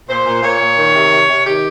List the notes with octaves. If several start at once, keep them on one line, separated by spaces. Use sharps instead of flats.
A#2 C5
A#2
A#2 C#5
A#2
D#3
C3
C3
C3
D#3 G4